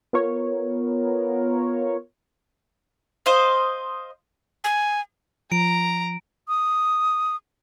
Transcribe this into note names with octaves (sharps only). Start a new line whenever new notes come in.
B3 F4 A#4 C#5
C5 D#5 F5
G#5
F3 A#5 D7
D#6